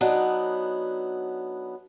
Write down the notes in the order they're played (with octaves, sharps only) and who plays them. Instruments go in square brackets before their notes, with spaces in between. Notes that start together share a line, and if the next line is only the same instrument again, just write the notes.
[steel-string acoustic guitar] F#3 B3 D4 D#4